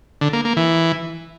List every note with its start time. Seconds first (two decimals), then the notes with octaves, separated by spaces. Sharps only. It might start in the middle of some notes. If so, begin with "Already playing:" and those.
0.21 D3
0.33 A#3
0.45 A#3
0.57 E3